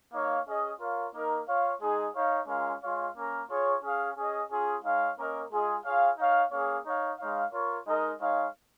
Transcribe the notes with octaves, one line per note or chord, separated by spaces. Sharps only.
A#3 D#4 C#5 F5
C#4 G#4 D#5
F4 A#4 C#5 F5
A#3 D#4 A#4
F4 C#5 F5
G#3 D#4 G#4
D#4 C#5 F5
G#3 C#4 F4 A#4 F5
G#3 F4 C#5 F5
A#3 C#4 A#4
F4 G#4 C#5
C#4 G#4 F5
C#4 G#4 D#5
C#4 F4 G#4
G#3 D#4 C#5 F5
A#3 C#4 A#4 D#5
G#3 F4 G#4 D#5
F4 G#4 C#5 F5
D#4 C#5 F5
A#3 C#4 G#4 C#5 F5
D#4 C#5 F5
G#3 D#4 C#5 F5
F4 A#4 C#5
G#3 D#4 A#4 D#5
G#3 D#4 C#5 F5